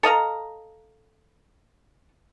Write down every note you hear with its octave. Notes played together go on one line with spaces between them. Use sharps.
A4 D#5 F5 A#5